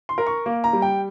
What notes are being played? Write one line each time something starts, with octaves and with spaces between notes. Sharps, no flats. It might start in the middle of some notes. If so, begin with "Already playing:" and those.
C6
A#4
C#6
A#3
A#5
G3
G5